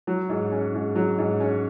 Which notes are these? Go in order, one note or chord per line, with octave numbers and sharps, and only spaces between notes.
F#3
G#2
C#4
G#2
F#3
G#2
C#4